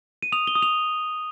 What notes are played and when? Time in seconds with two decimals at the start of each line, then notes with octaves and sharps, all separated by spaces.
0.22 D#7
0.32 D#6 F7
0.47 G7
0.55 D#6
0.62 F7